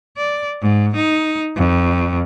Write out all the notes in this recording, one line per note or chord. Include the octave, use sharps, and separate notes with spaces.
D5
G#2
D#4
F2